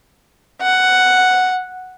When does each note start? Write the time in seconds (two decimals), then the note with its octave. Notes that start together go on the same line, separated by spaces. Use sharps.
0.62 F#5